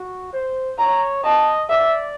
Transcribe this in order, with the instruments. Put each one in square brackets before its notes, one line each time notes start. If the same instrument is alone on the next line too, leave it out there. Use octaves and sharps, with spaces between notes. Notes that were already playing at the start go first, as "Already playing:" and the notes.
Already playing: [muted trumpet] F#4
C5
[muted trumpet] C#5 [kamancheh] A#5
[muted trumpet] D#5 [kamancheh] A5
[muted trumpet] D5 [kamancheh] E5